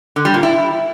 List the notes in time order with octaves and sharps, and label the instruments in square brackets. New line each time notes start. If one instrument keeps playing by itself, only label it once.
[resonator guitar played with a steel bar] D3
G3
A#2
E4